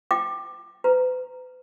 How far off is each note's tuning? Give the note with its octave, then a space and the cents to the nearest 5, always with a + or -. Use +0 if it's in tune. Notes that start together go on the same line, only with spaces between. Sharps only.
G5 +0 D6 +20
B4 +40 A#5 +0